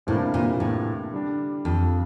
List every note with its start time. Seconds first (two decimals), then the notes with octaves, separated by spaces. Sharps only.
0.07 A2 C3 E3 G3 A#3 D4
0.34 A#2
0.60 A2
1.13 D3 G3 D4
1.65 F2